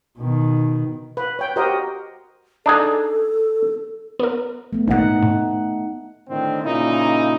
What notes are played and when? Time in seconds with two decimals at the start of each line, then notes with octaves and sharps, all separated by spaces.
0.18 B2 D#3
1.17 B4
1.39 C#5 G5
1.56 F#4 G4 A#4 C5 D#5
2.66 D4 D#4 G#4 A4
4.19 B3 A#4
4.73 A3 B3
4.88 G#1 A#2 D#4 F#5
5.23 A2
6.29 A2 D3 D#3 C4
6.64 A#2 C#3 D#4 E4